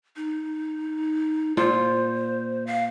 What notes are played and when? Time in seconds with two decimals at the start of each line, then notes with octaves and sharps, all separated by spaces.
0.16 D#4
1.57 A#2 F4 C5
2.67 F5